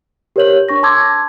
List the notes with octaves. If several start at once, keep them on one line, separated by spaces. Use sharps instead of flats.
G4 A#4 C5 C#5 G6 F#7
D4 C#6 A#6
A5 C6 D6 E6 G#6